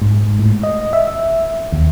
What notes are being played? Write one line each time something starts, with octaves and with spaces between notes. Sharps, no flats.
G#2
A2
D#5
E5
D#2